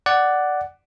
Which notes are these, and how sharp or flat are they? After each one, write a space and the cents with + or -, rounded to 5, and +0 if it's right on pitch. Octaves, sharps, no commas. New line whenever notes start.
D5 +0 F#5 +10 D6 +0